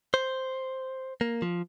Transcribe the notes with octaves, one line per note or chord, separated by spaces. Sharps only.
C5
A#3
F3